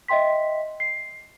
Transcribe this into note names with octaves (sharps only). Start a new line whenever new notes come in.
D#5 E5 G5 C6 B6
C7